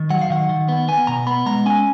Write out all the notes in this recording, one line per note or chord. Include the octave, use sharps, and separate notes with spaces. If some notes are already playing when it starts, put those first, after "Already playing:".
Already playing: D#3
F#3 F#5
F5
D#3 F#5
D#3
B3
B3 G#5
B2 A#5
B3 B5
G#3 A#5
C#4 G#5